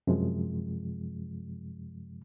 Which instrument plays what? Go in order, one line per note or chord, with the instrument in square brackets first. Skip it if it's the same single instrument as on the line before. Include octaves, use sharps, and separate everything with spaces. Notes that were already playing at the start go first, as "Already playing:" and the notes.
[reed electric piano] F#2 C3 F3 G#3